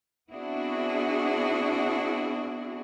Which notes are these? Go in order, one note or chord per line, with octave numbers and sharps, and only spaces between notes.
B3 C4 D4 E4 F#4 G#4